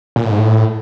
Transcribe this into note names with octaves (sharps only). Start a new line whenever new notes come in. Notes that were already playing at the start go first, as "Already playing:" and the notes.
A#2
A2
G#2
A2